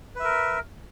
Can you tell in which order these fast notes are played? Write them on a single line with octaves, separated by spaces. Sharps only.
B4 E5 A#4